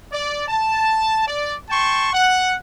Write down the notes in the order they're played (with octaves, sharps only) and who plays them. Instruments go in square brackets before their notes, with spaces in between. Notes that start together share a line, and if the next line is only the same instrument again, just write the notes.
[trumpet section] D5
A5
D5
G5 A5 C6 C#6
F#5